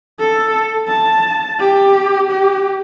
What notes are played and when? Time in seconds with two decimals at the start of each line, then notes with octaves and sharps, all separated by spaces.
0.20 A4
0.88 A5
1.60 G4
2.30 G4